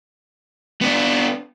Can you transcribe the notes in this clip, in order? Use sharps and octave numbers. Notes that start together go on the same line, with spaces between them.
B3 D4